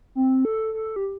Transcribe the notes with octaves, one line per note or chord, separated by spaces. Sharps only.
C4
A4
A4
G4